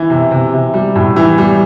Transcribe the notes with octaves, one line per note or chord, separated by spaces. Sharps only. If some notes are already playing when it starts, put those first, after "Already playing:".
Already playing: E3
C3
C3
C3
G3
A2
E3
G3